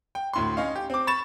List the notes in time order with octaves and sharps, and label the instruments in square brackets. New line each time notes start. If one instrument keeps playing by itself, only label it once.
[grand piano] G5
D2 A2 C6
C#4 D#4 F5
G4
C4 D6
B5 C#6 A6 E7